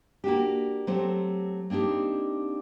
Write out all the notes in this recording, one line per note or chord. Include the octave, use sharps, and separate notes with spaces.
A#3 D4 F#4 G4
F#3 A3 C4 G4 C5
A#3 C4 D4 D#4 G4